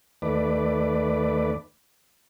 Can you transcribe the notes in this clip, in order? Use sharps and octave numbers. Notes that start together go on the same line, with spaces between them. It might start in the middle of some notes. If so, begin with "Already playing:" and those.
D#2 A3 B4 D5